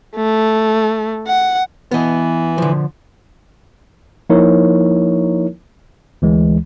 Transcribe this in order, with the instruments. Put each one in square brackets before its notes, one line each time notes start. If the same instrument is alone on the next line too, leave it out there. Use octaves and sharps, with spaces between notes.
[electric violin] A3
F#5
[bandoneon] E3 [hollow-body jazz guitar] B3 D#5
[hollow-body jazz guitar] D3 F3
[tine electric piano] F3 A#3 D#4 E4 A#4 C#5
D2 E3 G#3